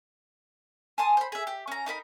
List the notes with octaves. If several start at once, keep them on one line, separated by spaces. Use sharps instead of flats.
G#5 A5 C6 D#6
C5 B5
G#4 E5
G4
C#4 A#5
D#4 A#4 A#5 B5